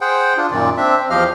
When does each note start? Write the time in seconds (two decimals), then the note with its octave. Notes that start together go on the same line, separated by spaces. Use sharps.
0.01 G#4 C5 F#5 G5
0.37 D4 F4
0.51 F#2 A#2 D#3 D5
0.77 C4 D4 E5
0.96 C4
1.10 E2 F3 G4 D#5 F5 F6